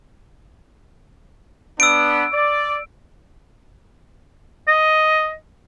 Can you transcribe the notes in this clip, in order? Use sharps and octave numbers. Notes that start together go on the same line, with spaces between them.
B3 D4 E6 D7
D5
D#5